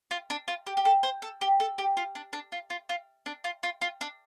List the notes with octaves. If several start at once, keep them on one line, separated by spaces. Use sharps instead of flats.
F4
D4
F4
G4
G4
A4
C5
A4
G4
A4
G4
F4
D4
D4
F4
F4
F4
D4
F4
F4
F4
D4